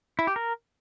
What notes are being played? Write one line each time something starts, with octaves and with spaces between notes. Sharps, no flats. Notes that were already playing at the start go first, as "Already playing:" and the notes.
E4
G4
A#4